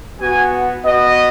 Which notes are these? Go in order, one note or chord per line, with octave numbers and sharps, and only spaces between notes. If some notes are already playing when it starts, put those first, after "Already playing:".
B3 F#4 G#5
B3 F#4 D#5